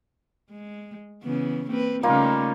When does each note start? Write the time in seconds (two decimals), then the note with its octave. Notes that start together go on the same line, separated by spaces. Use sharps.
0.50 G#3
1.23 C#3 E3 B3
1.68 A#3 C4 B4
2.03 C#3 G3 A3 A#3 D#4 F4